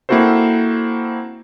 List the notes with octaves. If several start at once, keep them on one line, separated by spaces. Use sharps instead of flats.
A#3 C4 E4 F#4 A4 C5